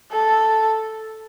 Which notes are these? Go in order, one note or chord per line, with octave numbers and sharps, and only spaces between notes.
A4